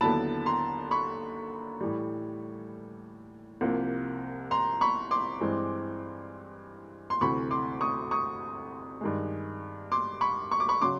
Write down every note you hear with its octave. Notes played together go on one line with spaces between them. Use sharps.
D#2 D3 F#3 B3 E4 A5 B5
A#5 C6
B5 C#6
A2 E3 G3
C2 C3 F3 A#3
A#5 C6
B5 C#6
C6 D6
G2 E3 G#3 C4
C6
D2 C3 E3 A3 B5 C#6
C6 D6
C#6 D#6
C#6 D#6
G2 D#3 G#3
C6 D6
B5 C#6
C#6
D6
B5 C#6
C#3 F#3 C6 D6